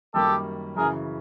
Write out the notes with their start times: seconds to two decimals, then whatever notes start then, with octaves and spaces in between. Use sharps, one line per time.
0.13 F#2 D#3 G3 A#3 G4 A4
0.76 F#2 C#3 E3 G#4 A#4